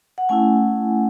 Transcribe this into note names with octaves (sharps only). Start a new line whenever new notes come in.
F#5
A3 C#4 E4 G#5